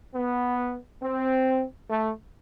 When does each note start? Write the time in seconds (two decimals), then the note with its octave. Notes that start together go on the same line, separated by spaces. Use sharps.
0.14 B3
1.02 C4
1.90 A3